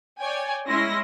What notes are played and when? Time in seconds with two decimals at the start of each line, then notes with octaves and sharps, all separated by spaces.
0.19 C#5 D5 G5 G#5
0.69 G#3 C#4 E4 C6 A#6